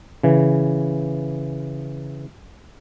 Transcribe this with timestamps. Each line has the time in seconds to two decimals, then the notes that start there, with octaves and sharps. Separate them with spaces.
0.23 C#3 E3